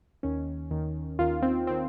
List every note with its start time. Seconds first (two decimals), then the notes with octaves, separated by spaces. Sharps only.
0.23 D#2 D#3 C#4
0.71 D#2 D#3
1.19 D#2 D#3 F4
1.42 C4
1.67 D#3 C4